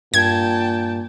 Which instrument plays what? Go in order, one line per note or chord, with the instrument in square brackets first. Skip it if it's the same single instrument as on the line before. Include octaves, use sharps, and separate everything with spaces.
[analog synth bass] G2 [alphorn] A#2 [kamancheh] G5 A5 [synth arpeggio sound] G#6